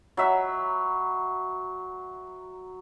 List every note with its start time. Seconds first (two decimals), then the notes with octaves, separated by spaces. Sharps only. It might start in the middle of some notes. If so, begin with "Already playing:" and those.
0.17 F#3 E5 B5